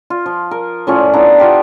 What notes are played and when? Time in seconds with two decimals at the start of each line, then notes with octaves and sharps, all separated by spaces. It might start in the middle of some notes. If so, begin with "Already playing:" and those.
0.10 F4
0.26 F3
0.51 A#4
0.87 A2 F3 C#4 D5
1.13 B3 D4 E4 A#5
1.40 B3 F4 G4